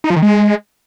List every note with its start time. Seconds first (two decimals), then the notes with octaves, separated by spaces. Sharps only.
0.04 D#4
0.10 F3
0.16 D#3
0.22 G#3